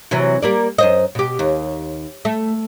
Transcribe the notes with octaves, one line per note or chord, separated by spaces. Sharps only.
C3 E3 F#3
G3 A#3 D5
F#2 C5 D#5
B2 G4
D#2
A3